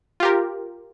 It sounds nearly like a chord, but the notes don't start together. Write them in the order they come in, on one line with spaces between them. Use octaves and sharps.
F4 G4 A#4